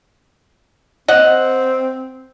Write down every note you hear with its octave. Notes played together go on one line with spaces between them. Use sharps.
C4 D#5 F#5